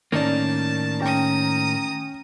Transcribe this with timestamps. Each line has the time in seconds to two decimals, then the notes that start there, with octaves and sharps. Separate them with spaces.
0.12 A2 D#3 A#3 C#4 D5 A5
1.00 C#4 G5 A#5 D#6